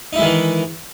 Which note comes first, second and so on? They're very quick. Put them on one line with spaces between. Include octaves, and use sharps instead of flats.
D#4 E4 G#3 D#3 E3